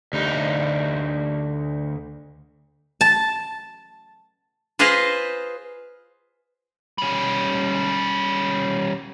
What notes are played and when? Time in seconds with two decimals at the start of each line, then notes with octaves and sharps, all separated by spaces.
0.13 D2 D#4
3.01 A5
4.79 F4 G#4 B4 C5 D#5 F5
6.98 G3 C#4